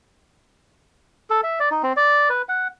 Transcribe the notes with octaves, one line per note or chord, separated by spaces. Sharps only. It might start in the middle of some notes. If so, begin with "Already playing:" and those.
A4
E5
D5
D#4
C4
D5
B4
F#5